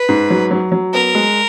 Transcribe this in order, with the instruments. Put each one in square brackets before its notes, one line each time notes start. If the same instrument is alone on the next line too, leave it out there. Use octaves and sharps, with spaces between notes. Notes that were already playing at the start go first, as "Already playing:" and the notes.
Already playing: [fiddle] B4
[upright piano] G#2
F#3
F#3
F#3
[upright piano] B3 [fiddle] A#4
[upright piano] G#3